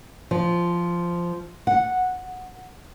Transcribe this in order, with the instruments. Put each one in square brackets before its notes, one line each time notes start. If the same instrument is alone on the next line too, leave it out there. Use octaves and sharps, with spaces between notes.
[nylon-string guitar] F3
F#5